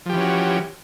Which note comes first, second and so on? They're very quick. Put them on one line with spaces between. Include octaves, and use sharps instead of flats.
F3 G4 E3 C#4 F#4